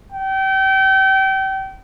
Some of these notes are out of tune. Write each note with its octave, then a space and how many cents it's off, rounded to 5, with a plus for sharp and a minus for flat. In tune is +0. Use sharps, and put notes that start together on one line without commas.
G5 -30